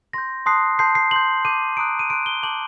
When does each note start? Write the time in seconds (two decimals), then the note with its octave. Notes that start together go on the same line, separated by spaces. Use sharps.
0.13 C6 G6 A#6
0.46 A5 C6 D#6 F#6 C7
0.79 A5 C6 G6 C7
0.95 C7
1.11 C6 G6 F#7
1.45 A5 D6 G6 D#7
1.77 A#5 D#6 F#6 D7
1.99 D#7
2.10 C6 F#6 D7
2.26 G7
2.43 A5 D6 G6 F#7